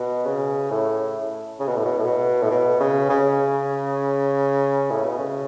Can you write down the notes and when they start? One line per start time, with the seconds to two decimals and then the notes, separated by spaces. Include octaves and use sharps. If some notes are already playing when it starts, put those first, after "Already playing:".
Already playing: B2
0.26 C#3
0.71 A2
1.60 C#3
1.68 B2
1.77 A2
1.85 B2
1.98 A2
2.05 B2
2.43 A2
2.51 B2
2.80 C#3
3.10 C#3
4.91 A2
5.05 B2
5.19 C#3